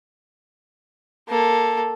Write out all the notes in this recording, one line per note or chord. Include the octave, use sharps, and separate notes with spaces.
A#3 A4